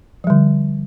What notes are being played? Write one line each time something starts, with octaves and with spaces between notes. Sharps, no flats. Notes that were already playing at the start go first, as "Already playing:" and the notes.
D3 F3 G3